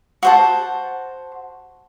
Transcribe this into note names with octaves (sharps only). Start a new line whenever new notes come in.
F#4 C5 A5